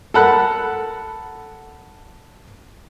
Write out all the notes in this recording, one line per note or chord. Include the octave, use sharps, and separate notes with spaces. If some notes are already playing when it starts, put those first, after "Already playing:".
A4 A#4 F#5 B5 F#6